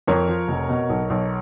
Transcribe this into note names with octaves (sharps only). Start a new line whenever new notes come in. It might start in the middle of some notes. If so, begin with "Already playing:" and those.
F2 A#4 C#5
F3
F1
B2
B1
B1